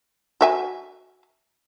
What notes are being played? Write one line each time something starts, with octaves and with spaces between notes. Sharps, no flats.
F#4 E5 G#5